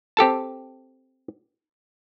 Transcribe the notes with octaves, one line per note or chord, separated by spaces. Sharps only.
C4 G4 A4 A5